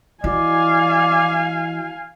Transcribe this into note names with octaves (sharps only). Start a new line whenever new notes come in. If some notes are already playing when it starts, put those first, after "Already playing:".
E3 E4 F#4 D5 D#5 F5 G#5